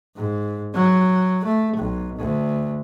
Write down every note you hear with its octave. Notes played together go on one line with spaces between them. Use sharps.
G#2
F#3
A3
B1
D2